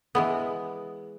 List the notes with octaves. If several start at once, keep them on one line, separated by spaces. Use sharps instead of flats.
E3 G#3 B3